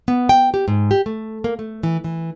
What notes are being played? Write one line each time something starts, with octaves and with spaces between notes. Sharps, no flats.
B3
G5
G4
G#2
G4
A3
A#3
A3
E3
E3